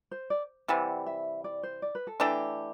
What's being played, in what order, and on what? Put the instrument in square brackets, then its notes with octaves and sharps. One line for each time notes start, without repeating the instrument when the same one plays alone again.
[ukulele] C5
D5
[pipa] C3 E3 G3 [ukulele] F#5
[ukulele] E5
D5
C5
D5
B4
A4
[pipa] E3 A3 D4 G4